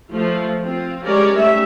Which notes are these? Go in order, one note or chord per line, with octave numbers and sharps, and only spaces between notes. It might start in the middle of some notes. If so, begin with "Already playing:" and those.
F3 A3 F4
C4 F4
G#3 C#4 G4 A#4 C#5 D5
G3 A3 C#4 D#4 E5